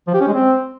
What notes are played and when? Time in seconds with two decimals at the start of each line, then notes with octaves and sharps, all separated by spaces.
0.07 F3
0.14 G4
0.21 C#4
0.27 G#3
0.34 C4